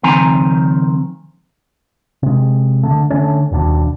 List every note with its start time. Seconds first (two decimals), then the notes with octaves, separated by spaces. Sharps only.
0.03 C#2 D#3 F3 C4 G#5 A#5
2.23 C3 G#3
2.83 D3 A3
3.10 D3 F#3 A3 C#4
3.51 D#1 D#2 B2 D4